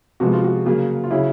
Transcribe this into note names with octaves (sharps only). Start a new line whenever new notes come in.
C3 F3 G#3 B3 F#4
F4
F#4
C#3 F#3 A#3
F4
C#3 F#3 E4